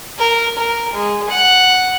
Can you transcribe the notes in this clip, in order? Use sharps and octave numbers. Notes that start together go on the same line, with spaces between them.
A#4
A#4
G#3
F#5